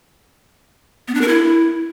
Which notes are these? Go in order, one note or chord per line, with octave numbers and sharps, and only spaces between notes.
B3
D4
A#4
E4